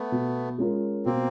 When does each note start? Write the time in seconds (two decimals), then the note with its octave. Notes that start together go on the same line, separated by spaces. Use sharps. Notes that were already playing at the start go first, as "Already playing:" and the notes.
Already playing: A3 B3
0.12 B2
0.58 G#3 C#4 F4 A#4
1.06 B2 A#3 C4